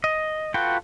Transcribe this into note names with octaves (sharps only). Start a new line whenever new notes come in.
D#5
F4 F#4 A4 B4 G5